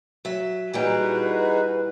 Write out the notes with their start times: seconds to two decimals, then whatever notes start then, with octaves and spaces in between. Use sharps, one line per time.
0.25 F#3 E5
0.73 A#2 E3 G3 D#4 F#4 G#4 B4